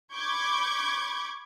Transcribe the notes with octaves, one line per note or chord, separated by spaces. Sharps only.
B5 C#6 D6 G6 G#6